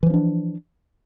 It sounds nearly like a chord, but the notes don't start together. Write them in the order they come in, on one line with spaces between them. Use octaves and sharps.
E3 F3 C#4 D4